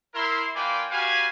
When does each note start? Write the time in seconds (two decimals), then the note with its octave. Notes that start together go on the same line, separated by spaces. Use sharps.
0.14 E4 A#4 C6
0.55 A#3 F4 B4 D5 G5 G#5
0.91 F#4 G4 B4 F5 G#5